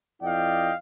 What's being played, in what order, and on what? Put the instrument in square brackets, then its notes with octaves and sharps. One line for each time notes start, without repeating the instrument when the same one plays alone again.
[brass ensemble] F2 E4 D5 D#5 F5 G5